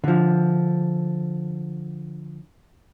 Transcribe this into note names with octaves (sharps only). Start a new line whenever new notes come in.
D3 F3